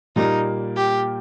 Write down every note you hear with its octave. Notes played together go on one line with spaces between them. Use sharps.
A#2 G3 A#3 D#4
G4